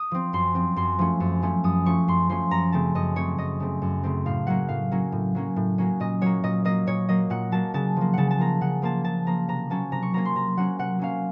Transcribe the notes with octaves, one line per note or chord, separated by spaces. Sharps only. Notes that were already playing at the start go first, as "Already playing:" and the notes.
Already playing: D#6
F3 C4
F#2 C6
F3 C4
F#2 C6
F3 A3 C#4
F#2
F3 A3 C#4
F#2 D#6
F3 A3 C#4 C#6
F#2 C6
F3 A3 C#4 C6
F#2 A#5
C#3 A3 C4 A5
F#2 D#5
C#3 A3 C4 C#5
F#2 D#5
C#3 A3 C4
F#2
C#3 A3 C4
A2 F5
F#3 A#3 C#4 F#5
A2 F5
F#3 A#3 C#4
A2
F#3 A#3 C#4
A2
F#3 A#3 C#4
A#2 D#5
F#3 A#3 C#5
A#2 D#5
F#3 A#3 D#5
A#2 C#5
F#3 A#3 D#5
A#2 F#5
F#3 A#3 A5
C#3 A5
F3 A#3
C#3 F#5 A5
A5
F3 A#3 A#5
C#3 F#5
F3 A#3 A5
C#3 A5
F3 A#3 A#5
C3 A#5
F#3 A#3 C#4 A5
C3 A#5
C#6
F#3 A#3 C#4 A#5
C6
C3 A#5
F#3 A#3 C#4 F#5
C3 F#5
F#3 A#3 C#4 F5